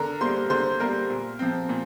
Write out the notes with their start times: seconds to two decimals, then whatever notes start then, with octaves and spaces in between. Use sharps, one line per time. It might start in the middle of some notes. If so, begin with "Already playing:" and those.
Already playing: D3 A#4 A#5
0.21 G3 A#3 C5 C6
0.50 D3 C5 C6
0.80 G3 A#3 A#4 A#5
1.09 A#2
1.39 F3 C4
1.69 A#2